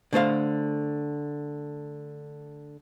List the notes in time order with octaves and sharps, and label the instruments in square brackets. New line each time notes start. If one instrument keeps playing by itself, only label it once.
[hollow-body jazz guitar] D3 A3 C5 F5